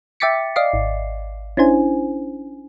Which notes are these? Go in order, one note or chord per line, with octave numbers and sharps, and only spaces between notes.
E5 G5 D6 A6 B6 C#7
D5 D#5 F5 D6 C7
G#1
C#4 D4 E4 C5 G#5